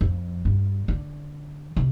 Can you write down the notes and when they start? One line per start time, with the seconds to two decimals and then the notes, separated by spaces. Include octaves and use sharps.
0.01 F2
0.45 G2
0.88 D3
1.76 C3